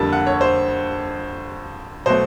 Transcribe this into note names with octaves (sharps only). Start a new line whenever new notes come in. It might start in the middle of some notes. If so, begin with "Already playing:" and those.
Already playing: F2 D3 G3 A#3 A5
F#5
C#5
C5
B2 F#3 A3 C5